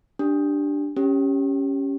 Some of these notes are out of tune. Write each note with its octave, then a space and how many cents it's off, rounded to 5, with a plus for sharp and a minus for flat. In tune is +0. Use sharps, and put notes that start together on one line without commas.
D4 +0 G4 +0
C#4 +0 G4 +0